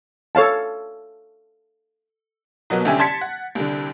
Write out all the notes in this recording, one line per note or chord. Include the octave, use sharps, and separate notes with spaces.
A4 C#5 F5 A5
B2 F#3 A#3 B3
C2 D3 C#4 G4 E5 G#5
A5 C6 G#6 A6 B6 C#7
F#5
C2 D3